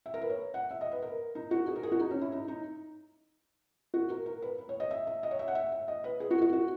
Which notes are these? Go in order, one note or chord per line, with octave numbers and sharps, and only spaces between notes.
E5
A#4
B4
C#5
F#5
E5
D#5
B4
A#4
D#4
F#4
G#4
A#4
G#4
F#4
D#4
C#4
E4
D#4
D#4
F#4
A#4
A#4
B4
B4
C#5
D#5
E5
E5
D#5
C#5
E5
F#5
E5
E5
D#5
B4
G#4
F#4
F#4
F#4